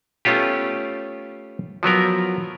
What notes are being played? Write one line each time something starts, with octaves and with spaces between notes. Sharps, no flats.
A3 B3 C#4 F4 G4
F3 F#3 B3 A#4